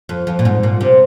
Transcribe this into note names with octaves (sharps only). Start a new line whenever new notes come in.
F2
F2
A#2
G#2
A#2
C3